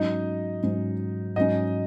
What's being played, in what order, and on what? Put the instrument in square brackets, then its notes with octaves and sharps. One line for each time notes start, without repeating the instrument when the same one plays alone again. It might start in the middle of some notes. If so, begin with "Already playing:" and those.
Already playing: [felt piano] G#2 F#3 C#4 [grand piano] D#4 D#5
[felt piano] G#2 F#3 C#4
[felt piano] G#2 F#3 C#4 [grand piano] D#4 D#5